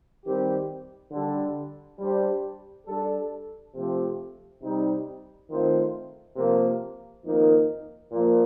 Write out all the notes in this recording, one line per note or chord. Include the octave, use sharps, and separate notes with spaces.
D#3 G3 C4 G4
D3 G3 D4 A4
G3 D4 G4 C5
G3 D4 A4
C3 F3 A3 C4 G4
C3 G3 C4 D#4
D#3 A3 C4 F4 C5
C3 F3 A#3
F2 D#3 A#3 D#4 A#4
A#2 F3 A#3